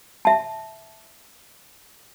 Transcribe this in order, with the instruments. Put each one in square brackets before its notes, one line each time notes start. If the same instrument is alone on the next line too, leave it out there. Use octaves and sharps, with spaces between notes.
[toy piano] E5 A5